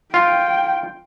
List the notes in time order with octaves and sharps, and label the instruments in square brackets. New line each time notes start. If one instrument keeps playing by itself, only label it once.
[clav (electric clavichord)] F4 [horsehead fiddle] G5